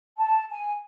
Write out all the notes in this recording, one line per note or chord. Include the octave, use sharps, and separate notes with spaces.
A5
G#5